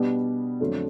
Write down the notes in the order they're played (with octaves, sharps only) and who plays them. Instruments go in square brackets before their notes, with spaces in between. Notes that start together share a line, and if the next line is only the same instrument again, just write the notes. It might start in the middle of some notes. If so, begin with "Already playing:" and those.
Already playing: [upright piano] B2 G3 B3 D4
F2 D3 F#3 A3 D4